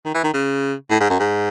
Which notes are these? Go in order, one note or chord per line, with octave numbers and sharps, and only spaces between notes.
D#3
E3
D#3
C#3
A2
G#2
F#2
G#2